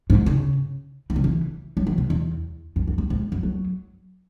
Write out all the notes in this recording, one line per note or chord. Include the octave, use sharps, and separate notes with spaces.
G#2
C#3
E3
C#3
E3
F#3
E3
B2
E2
F#2
E2
F#2
G#2
F#2
F#3